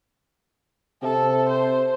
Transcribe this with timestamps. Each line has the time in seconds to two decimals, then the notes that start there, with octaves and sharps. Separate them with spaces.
1.03 C3 A4
1.49 C5